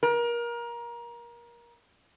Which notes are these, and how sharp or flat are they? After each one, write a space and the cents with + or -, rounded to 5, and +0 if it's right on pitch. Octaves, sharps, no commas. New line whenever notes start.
A#4 +25